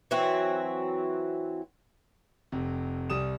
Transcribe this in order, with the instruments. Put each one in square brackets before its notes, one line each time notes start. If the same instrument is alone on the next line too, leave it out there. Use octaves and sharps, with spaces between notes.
[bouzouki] E3 F#3 C4 F#4
[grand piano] F1 C3
C2 G3 D#6 E7